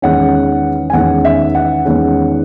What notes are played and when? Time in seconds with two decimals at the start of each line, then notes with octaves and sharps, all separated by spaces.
0.02 E2 D#3 G#3 C#4 F#5
0.90 G#5
0.93 E2 D#3 G#3 C#4 F#5
1.25 E5
1.55 F#5
1.85 E2 D#3 G#3 C#4